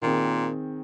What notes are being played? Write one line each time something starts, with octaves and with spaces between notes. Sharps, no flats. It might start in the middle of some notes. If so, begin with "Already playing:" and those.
A#2 D#3 C4 G#4